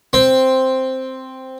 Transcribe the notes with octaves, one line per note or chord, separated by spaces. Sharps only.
C4